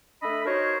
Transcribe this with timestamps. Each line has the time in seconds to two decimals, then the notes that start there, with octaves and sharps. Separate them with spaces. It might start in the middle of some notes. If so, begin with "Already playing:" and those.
0.23 A3 D4 D#5 E5 B5
0.46 D#4 F#4 A#4 C5 C#5